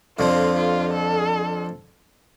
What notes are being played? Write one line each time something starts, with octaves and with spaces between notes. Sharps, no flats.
F2 D3 F3 F4
F4
A4